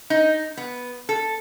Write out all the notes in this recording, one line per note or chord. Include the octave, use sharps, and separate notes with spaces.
D#4
B3
A4